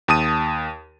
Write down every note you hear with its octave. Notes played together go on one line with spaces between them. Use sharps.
D#2 A5 D#6 D#7